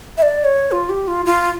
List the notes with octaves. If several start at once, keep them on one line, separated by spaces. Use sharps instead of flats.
E5
D5
C#5
F4
G4
F4
F4